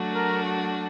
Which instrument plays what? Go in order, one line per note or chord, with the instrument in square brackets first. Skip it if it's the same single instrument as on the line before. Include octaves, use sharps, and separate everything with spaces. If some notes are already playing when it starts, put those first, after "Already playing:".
Already playing: [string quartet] F#3 A3 D4 F#4
[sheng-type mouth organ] A#4